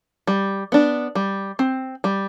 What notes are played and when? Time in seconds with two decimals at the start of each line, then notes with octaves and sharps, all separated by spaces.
0.27 G3
0.72 B3 D4
1.15 G3
1.59 C4
2.04 G3